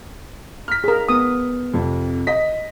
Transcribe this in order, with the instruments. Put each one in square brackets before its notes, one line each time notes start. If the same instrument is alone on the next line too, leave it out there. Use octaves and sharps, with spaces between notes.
[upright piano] F6 B6
[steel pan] G#4 A#4
[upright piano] B3 [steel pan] D#6
[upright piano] F2 C3
D#5 B6